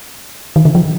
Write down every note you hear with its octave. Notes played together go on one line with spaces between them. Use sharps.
D#3
D3
F3